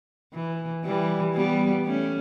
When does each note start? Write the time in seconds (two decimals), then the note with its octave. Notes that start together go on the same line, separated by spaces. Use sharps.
0.34 E3
0.85 E3 G3
1.35 G3 B3
1.86 A3 C#4